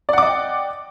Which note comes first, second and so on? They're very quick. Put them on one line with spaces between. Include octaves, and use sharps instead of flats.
D5 F#5 D6 D#5 G5